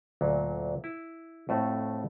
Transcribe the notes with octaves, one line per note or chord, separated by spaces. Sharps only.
D2 A#2 F#3
E4
F2 A2 A3 F#4